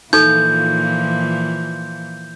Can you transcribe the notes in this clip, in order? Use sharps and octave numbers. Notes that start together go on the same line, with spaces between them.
A#2 E3 F3 D#4 A4 G6